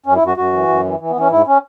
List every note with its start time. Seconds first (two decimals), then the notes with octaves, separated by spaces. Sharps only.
0.06 F#2 C#4
0.16 E4
0.21 F#2
0.27 F#4
0.37 F#2 F#4
0.53 E3
0.68 F#2
0.85 E3
1.00 E3
1.10 B3
1.16 E3 C#4
1.31 G#2 E4
1.47 C#4